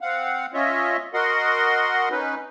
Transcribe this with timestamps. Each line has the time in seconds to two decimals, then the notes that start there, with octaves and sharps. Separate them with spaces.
0.01 C4 F5 F#5
0.54 C#4 F4 C#5 D#5 E5
1.14 F#4 A#4 D#5 F#5 C6
2.10 C#4 D#4 B4